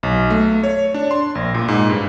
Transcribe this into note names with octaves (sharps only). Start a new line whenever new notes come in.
B1
A3
C#5
D4
C6
A#1
A#2
G#2
G2